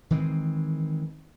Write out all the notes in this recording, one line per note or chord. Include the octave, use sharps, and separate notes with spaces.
D#3 E3 G#3 C4